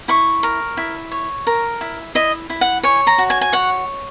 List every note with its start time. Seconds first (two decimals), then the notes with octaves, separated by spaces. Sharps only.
0.08 E4 C#6
0.43 A#4
0.77 E4
1.11 C#5
1.47 A#4
1.81 E4
2.15 E4 D#5
2.50 E4
2.61 F#5
2.83 C#5 G#5
3.07 A#5
3.18 F#4
3.30 G#5
3.41 G#5
3.53 C#5 F#5